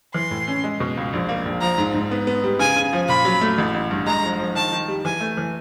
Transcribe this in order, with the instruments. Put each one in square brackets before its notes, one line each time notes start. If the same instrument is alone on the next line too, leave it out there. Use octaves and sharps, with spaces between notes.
[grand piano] E3 [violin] C6
[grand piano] A2
C#4
G#3
B2
C#2
A#1
A#3
A#1
[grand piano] F3 [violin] A#5
[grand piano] G#2
G#2
B3
B3
G3
[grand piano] C#3 [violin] G#5
[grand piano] C#3
F3
[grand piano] A#2 [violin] B5
[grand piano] F#3
A3
A1
A1
G2
[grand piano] G#3 [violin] A#5
[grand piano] F3
F3
[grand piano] D#3 [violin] A5
[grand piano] D#3
G3
[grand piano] E3 [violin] G#5
[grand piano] A3
E3